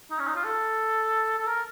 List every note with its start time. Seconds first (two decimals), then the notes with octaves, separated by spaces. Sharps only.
0.11 D#4
0.19 C#4
0.27 D#4
0.36 F4
0.44 A4
1.38 A4
1.46 A#4